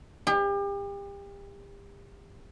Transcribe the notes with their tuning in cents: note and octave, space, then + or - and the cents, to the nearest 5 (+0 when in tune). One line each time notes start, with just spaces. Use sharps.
G4 +35